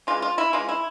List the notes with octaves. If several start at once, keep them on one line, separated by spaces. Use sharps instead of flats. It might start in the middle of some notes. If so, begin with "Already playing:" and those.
C#3 E3 G#3 F4
F4
E4
C#3 E3 G#3 F4
E4